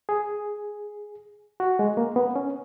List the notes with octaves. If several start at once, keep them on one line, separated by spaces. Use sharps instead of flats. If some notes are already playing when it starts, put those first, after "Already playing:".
G#4
F#4
G#3
A#3
B3
C#4